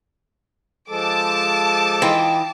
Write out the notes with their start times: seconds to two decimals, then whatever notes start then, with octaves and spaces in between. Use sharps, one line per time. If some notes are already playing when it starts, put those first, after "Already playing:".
0.89 F3 G#3 A4 A5 D6
2.02 E3 D#4 F4 G5